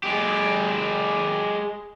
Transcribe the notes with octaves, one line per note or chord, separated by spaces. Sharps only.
G#3 G4